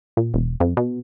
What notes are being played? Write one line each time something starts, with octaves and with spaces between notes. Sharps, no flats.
A#2
E1
F2
B2